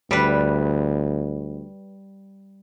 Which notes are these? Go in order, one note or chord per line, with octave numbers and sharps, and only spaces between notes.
D2 G3 B4